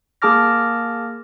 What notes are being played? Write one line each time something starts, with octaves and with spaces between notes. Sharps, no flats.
A#3 G#4 A5 D6 F6 A#6